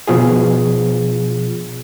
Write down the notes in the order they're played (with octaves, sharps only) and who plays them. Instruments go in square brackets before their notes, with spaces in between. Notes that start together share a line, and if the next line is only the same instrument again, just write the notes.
[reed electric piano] B2 F3 F4 G#4